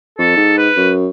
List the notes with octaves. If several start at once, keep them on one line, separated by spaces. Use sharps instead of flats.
F2 A4
G#2
B4
F#2